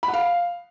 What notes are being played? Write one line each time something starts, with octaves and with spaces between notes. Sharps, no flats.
B5
F#5
F5